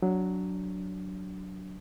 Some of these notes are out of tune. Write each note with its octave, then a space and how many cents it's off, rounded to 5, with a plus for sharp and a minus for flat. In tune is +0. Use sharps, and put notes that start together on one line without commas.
F#3 +0 D4 -15